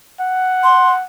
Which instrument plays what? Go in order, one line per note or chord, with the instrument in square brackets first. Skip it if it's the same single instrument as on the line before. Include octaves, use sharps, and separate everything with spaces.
[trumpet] F#5
[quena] C6